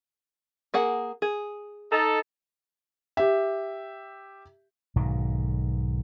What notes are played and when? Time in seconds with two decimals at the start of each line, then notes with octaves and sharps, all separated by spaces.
0.74 A#3 G#4 F#5
1.22 G#4
1.91 D#4 A4
3.17 G4 E5
4.96 B1 G#2 D#3